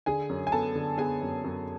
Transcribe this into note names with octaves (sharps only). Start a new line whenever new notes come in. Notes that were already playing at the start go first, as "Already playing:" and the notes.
D3 G#4 G#5
F#2
G#5
B3 A4 A5
D3
B3 G#4 G#5
F#2
F#2